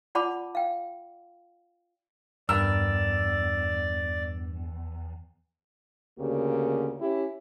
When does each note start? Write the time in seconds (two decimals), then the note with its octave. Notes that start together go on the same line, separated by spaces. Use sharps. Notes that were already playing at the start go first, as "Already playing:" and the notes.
0.15 F4 D5 F#5 A5 B5 D6
0.55 F5 G5
2.49 E2 G2 A#4 D5 E6
6.19 D2 C#3 A#3 G4 A#4
7.01 C#4 E4 G4